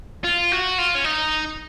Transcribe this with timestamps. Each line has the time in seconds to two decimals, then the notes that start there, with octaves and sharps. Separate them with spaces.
0.24 F4
0.52 F#4
0.78 F4
0.95 C#4
1.04 D#4